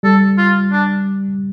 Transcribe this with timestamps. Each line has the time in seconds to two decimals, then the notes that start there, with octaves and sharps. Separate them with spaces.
0.03 G3 A4
0.38 F4
0.72 D4